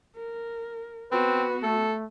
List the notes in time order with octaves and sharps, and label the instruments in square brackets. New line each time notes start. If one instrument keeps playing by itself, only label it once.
[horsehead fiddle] A#4
[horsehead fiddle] B3 F#4 [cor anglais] C4 [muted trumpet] B4
[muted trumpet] A3 [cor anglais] A4